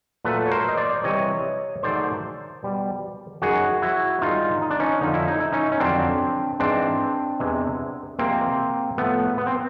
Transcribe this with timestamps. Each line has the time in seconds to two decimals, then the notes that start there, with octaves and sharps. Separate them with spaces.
0.24 A#2 F#3 A3 A4 B4
0.47 C#5
0.51 A#4 C5
0.68 D#5
0.77 C5 D5
1.04 C3 E3 G3 C#5 D#5
1.83 G#2 D#3 F#3 A3 C5 D5
2.63 B2 G3
3.42 F#2 D#3 G#3 F#4 G#4
3.82 E4 F#4
4.21 G#2 D#3 G3 D#4 F4
4.62 D#4
4.70 D4
4.79 C#4 D#4
5.01 F2 D3 F3 D#4
5.14 E4
5.27 D#4
5.40 E4
5.52 C#4 D#4
5.72 C#4
5.80 F2 D3 F#3 C4 D4
6.59 G#2 E3 G#3 C4 D4
7.40 E2 C3 E3 G#3
8.19 C3 F3 G#3 A#3 C4
8.98 A2 F3 A3 B3
9.38 B3
9.47 C4